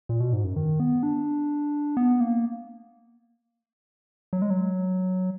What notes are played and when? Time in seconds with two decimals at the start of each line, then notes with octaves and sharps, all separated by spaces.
0.09 A#2
0.20 B2
0.33 G#2
0.44 F#2
0.56 D#3
0.80 B3
1.03 D4
1.97 B3
2.21 A#3
4.33 F#3
4.42 G#3
4.50 F#3